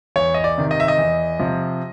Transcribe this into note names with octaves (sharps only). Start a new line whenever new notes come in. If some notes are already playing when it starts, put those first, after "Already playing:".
E2 C#5
D#5
D5
C3 D#3
D#5
E5
D#5
E2
C3 F3